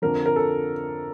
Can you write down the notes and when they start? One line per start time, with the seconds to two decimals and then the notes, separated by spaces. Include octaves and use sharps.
0.02 F2 D3 F3 A#4
0.26 A#4
0.36 A4